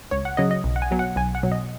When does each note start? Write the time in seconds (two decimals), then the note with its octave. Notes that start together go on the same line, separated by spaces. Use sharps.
0.11 C#2 C#5
0.25 F#5
0.37 C#3 F#3 D#5
0.51 D#5
0.64 B1
0.76 F#5
0.82 G#5
0.91 B2 F#3
0.99 F#5
1.16 B1 G#5
1.35 F#5
1.43 B2 F#3
1.52 D#5